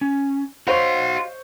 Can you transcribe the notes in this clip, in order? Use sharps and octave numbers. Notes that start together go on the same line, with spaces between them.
C#4
F#4 C5 C#5 D#5 F5 C6 C#6